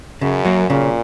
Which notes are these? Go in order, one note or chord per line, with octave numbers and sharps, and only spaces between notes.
F#2 C#3
F#3 A#3
A#2 C#3